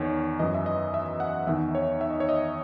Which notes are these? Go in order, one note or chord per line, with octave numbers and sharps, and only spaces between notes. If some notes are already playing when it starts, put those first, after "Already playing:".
Already playing: E2 D#3 C#5
F#2 E3 D#5
E5
D#5
E5
F#5
E2 D#3 E5
C#5
E5
D#5
C#5
D#5